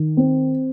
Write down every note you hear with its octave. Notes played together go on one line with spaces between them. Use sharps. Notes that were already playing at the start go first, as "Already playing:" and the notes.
Already playing: D#3
C4